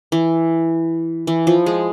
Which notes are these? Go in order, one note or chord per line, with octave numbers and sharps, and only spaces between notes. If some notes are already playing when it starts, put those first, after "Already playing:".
E3
E3
F3
G#3